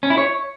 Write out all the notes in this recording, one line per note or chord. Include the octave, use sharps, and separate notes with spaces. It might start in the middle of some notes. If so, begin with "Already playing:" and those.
C#4
E4
C#5